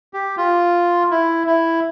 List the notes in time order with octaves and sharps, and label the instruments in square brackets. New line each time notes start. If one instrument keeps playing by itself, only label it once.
[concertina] G4
F4
E4
E4